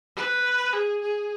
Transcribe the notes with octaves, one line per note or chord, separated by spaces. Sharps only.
B4
G#4
G#4